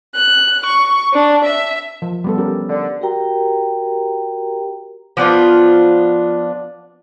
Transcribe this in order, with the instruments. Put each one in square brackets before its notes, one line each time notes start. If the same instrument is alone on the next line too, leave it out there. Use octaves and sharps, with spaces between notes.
[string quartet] F#6
C#6
D4
E5
[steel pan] F3
G3 B3 A4
C#4 G4 A#4
[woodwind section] D3
[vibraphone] F#4 G4 A#4 G5 A#5
[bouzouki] F3 B3 D4 F4